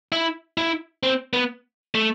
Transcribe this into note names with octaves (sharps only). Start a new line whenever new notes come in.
E4
E4
C4
B3
A3